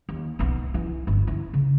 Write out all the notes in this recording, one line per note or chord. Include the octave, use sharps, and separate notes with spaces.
D#2
B1 B3
E3
G1
E4
C#3